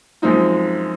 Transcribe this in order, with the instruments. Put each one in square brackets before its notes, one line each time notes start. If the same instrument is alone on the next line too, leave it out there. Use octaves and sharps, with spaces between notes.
[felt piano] F#2 F3 G#3 C4 D#4 F4